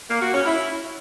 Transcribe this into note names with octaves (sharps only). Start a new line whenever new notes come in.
A#3
F#4
C#4
E4